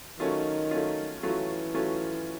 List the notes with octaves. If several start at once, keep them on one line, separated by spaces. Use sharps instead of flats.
D#3 F#3 A3 C#4 F4
F#3 A3 C#4 F4
E3 F#3 A3 C#4 F4
F#3 A3 C#4 F4